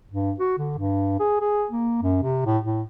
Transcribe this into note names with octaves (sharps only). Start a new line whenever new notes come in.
G2
F#4
D3
G2
G#4
G#4
A#3
F#2
C3
A2
A2